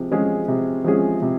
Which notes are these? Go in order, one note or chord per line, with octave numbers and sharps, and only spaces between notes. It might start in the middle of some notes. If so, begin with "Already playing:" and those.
Already playing: C3 F3 G#3
F3 G#3 C#4 G#4
C3
F3 G#3 C#4 G#4
C3